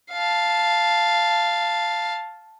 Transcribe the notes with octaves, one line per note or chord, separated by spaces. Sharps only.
F5 A5